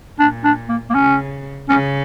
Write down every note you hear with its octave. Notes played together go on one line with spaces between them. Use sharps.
A#2 D4
D4
A#3
A#3
C#3 C#4
C#3 C#4